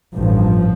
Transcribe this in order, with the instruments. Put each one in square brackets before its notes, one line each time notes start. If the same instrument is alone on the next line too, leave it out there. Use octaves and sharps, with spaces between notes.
[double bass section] A1 G2 F3